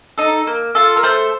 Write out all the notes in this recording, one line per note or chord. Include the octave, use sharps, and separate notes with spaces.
D#4 A4
A#3
F4 A4
A#4
A3 A4 C5